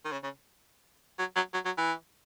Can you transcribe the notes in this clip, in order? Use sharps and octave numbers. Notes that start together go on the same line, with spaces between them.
D#3
C#3
C#3
F#3
F#3
F#3
F#3
E3